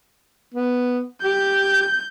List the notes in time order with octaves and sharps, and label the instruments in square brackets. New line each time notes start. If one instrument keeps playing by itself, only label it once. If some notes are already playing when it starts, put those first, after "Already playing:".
[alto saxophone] B3
[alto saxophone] G4 [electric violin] G6